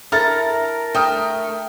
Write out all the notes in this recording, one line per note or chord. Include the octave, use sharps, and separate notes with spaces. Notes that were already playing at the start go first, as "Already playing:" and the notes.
E4 A4 A#4 A#5 F6 A6
A3 G5 D#6 F6